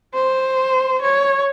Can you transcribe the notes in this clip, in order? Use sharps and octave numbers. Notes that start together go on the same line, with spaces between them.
C5
C#5